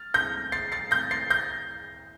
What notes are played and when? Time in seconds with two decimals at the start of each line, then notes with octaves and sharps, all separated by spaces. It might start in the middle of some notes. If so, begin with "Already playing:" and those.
Already playing: F6 A6
0.14 G6 A#6
0.52 A6 C7
0.72 A6 C7
0.91 G6 A#6
1.11 A6 C7
1.30 G6 A#6